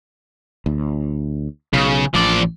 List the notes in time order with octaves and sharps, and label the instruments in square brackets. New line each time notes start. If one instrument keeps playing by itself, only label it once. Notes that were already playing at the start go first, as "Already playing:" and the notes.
[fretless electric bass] D2
[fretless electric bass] B1 [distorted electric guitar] C#3
[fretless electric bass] A1 [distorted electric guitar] F3 D5